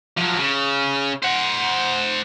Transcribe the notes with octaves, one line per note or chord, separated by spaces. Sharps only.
F3 F#3
C#3
C5 F#5